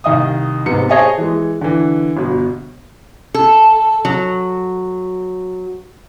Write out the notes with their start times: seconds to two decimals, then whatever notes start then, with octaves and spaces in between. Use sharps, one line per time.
0.04 C2 D#3 D#5 F5 D#6
0.66 G#2 C3 B3 D#4 C#7
0.89 G#4 C5 C#5 D#5 G#5 A5
1.18 E3 G#3
1.61 D3 E3
2.17 G1 B2
3.35 A4
4.05 F#3